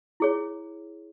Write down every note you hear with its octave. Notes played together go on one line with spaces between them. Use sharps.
E4 G#4 C#5